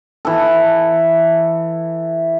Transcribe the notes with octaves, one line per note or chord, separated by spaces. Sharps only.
E3 A4